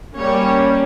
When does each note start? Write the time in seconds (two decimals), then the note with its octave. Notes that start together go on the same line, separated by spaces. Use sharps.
0.15 G3 A#3 C#4 C#5